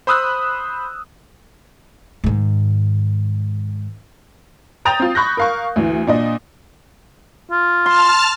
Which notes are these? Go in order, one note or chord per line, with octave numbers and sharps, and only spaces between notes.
C5 B5 D#6 E6 F#6
G#2 D#3
G5 A#5 D#6 G6 A6 F7
C4 F4
B5 C#6 F#6 G6 A#6
A#4 F5 C#6
D2 E3
A#2 D4 D#5
F4
A5 C6 F6